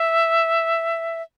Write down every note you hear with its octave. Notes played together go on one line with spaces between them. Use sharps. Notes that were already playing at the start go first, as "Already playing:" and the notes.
Already playing: E5